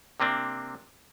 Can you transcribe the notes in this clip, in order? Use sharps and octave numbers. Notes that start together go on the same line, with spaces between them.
C3 A#3 C4 D4